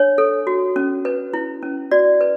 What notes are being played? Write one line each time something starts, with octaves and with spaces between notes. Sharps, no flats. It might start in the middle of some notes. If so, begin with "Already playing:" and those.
Already playing: D4 C#5
A4
F#4
C#4
B4
E4
C#4
F#4 D5
B4